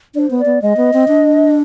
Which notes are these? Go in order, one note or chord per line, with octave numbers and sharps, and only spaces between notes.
D4 C5 D5
B3
D5
B3
G#3 D#5
B3
C4
D4